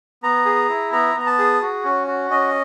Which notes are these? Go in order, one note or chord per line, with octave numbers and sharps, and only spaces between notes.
B3 A#5
G#4
E4
B3 A#5
B3
A#5
A5
G#4
F#4
C#4
F#4
C#4 D#5